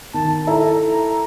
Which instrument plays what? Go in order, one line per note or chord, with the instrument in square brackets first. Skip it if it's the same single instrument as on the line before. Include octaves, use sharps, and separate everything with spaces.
[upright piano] D#3 [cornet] A5
[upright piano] E4 A4 E5 [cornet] A#5